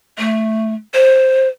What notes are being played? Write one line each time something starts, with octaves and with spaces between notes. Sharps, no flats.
A3
C5